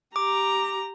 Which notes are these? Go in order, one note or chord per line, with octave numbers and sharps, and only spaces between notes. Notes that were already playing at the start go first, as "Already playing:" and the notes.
G4 A#5 D6